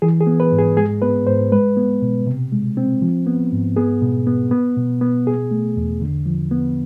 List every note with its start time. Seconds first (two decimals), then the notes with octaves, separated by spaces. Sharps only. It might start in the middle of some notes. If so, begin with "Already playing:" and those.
0.02 E3 G#4
0.21 G#4
0.27 B3
0.40 B4
0.52 G#2
0.59 G#4
0.77 G#3 G#4
1.02 B3 B4
1.27 G#2 C5
1.52 G#3 B4
1.77 B3
2.02 B2
2.27 C3
2.52 G#3
2.77 C4
3.02 F3
3.27 B3
3.52 G#2
3.76 B3 G#4
4.02 B2
4.27 B3
4.51 B3
4.77 B2
5.01 B3
5.27 B2 G#4
5.51 A3
5.77 E2
6.02 D3
6.26 F3
6.51 B3